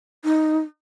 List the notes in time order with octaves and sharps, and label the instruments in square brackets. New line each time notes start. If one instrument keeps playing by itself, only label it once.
[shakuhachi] D#4